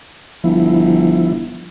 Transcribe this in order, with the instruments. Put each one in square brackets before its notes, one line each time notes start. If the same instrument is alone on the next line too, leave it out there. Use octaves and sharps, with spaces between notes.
[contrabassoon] G1 [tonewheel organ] F3 E4